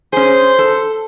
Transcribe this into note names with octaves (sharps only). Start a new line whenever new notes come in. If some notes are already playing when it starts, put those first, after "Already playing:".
C#4 G#4 C5
A4